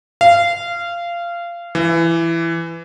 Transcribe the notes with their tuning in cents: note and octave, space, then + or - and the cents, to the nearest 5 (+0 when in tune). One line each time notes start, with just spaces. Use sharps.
F5 -20
E3 +15